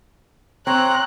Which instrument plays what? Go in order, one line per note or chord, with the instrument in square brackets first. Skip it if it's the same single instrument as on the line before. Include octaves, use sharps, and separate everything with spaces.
[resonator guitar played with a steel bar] C4 [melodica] C#5 A#5 [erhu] F#6